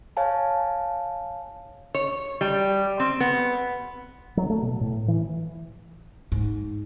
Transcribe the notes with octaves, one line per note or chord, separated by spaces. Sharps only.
C#5 F5 G#5 A5
C#5
G3
C4
B3
F#3
A3
B2
A2
E3
G#2